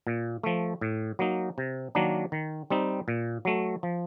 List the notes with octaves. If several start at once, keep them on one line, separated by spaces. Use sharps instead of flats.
A#2
F3 A3
A2
F#3 A#3 D#4
C3
D#3 F#3 A#3 D4
D#3
G3 C4 D#4
A#2
F#3 A3
F3